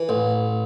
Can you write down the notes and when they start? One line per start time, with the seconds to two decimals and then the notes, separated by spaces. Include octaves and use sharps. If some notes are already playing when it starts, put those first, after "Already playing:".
Already playing: E3
0.09 A1